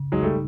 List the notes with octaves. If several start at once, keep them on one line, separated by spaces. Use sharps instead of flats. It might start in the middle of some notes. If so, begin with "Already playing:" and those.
Already playing: C#3
F#3 G#3 D#4
G3 A3